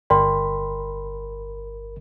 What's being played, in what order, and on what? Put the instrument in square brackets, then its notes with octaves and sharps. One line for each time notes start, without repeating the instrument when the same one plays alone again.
[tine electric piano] G1 A#4 B5 [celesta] D5 G5 C6